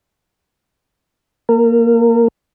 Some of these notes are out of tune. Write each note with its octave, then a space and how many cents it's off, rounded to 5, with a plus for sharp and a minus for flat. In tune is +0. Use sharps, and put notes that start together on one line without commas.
A#3 +0 A#4 -25